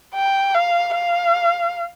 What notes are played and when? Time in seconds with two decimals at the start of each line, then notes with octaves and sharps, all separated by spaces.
0.15 G5
0.54 F5
0.95 F5